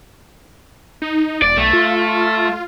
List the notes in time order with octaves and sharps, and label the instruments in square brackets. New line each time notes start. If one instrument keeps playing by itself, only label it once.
[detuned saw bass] D#4
[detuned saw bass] E1 [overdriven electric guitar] D5
[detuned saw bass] B1 [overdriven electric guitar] A3
[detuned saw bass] F4